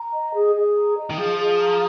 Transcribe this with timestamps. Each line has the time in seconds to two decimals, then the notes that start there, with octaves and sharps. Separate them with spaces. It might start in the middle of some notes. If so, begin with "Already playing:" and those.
Already playing: A#5
0.13 D#5
0.33 G#4
0.54 G#4
0.76 A#5
0.97 D#5
1.10 D#3
1.17 F3 G#4
1.38 G#4
1.59 A#5